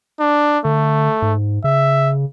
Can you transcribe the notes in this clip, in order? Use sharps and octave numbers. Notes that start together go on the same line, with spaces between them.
D4
D3 A3
G#2
C#3 E5